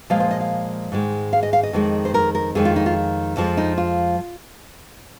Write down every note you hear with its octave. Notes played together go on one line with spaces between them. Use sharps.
A#2 F3 G#3 F5
C5
D#5
F5
G#2 D#3 G#3
F5
D#5
F5
D#5
F2 D#3 G#3
C5
A#4
A#4
F2 D#3 G#3 G#4
F4
D#4
F4
F2 F3 G#3
D#4
F4